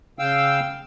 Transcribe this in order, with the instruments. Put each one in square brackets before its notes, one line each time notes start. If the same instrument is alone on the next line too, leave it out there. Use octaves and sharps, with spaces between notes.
[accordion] C#3 F5 G5 E6